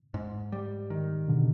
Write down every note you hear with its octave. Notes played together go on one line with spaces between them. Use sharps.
G#2
G3
D#3
B2 D3